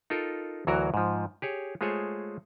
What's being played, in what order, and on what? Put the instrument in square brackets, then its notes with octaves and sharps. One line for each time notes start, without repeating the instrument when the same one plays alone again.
[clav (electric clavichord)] D#4 F4 A4 A#4
D2 E3 F#3 F#4 A#4 A#5
G#2 F3
G4 G#4 C#5
G#3 A3 F4 G#4 C5 C#5